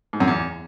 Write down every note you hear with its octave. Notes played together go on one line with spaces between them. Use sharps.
G#2
F#2
E2